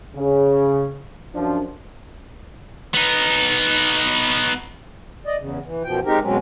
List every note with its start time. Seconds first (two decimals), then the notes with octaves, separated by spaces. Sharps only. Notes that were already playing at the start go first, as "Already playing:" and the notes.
0.16 C#3
1.35 F#2 F3 D4
2.94 B3 D#4
5.24 D5 D#5
5.39 E2 C#3
5.64 E3
5.84 F#2 B2 F3 G5
6.05 G#3 C4 D#4 G4 A#4
6.23 E2 B2 F#3 G#3 C4 C#4